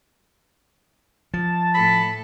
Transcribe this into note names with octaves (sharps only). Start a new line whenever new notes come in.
F3 A5
A2 A4 B5